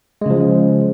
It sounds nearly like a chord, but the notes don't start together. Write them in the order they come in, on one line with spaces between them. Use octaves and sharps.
G#3 C#3 F3